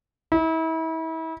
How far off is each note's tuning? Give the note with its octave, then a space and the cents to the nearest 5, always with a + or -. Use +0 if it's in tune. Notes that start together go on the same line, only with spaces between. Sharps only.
E4 -35